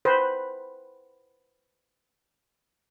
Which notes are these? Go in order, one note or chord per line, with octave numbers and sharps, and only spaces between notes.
B4 C5